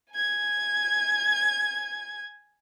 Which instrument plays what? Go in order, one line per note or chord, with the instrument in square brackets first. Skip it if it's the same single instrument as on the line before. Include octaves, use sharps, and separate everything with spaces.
[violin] G#5 G#6